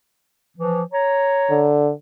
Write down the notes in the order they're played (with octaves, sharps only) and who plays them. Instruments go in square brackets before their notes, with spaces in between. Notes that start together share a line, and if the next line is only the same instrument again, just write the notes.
[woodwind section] E3 F3
C#5 A#5
[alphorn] D3